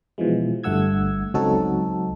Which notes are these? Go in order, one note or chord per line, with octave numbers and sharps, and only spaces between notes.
B2 E3 F3 G#3
G1 G2 A3 F#5 E6 G#6
C#2 F#3 C4 D#4 F#4 A4